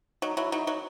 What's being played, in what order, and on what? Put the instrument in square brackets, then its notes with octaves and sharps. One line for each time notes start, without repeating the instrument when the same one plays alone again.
[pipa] F#3 [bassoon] D#4
[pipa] F#3 [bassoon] E4
[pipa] F#3 [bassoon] D#4
[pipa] F#3 [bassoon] D#4